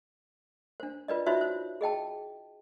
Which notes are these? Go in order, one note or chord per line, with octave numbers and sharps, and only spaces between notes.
D4 C5
F4 B4 D5 D#5
D#4 F4 F#4 C5 C#5 E5
C5
G#4 D#5 G5 A5